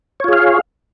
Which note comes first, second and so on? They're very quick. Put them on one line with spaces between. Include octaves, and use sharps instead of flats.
C#5 F4 G#4 F5